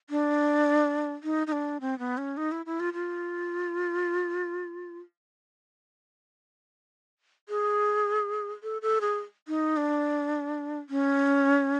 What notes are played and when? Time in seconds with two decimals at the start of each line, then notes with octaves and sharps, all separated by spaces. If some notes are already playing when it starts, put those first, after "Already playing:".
0.10 D4
1.23 D#4
1.47 D#4
1.52 D4
1.81 C4
1.99 B3
2.18 C#4
2.37 D#4
2.52 E4
2.66 E4
2.80 F4
2.93 F4
7.49 G#4
8.63 A4
8.82 A4
9.01 G#4
9.48 D#4
9.77 D4
10.89 C#4